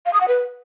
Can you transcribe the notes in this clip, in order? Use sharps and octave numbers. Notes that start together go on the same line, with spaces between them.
F5
D#6
F#5
B4